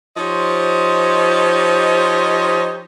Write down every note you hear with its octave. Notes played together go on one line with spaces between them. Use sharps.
F3 D#4 G4 C5 C#5 D#5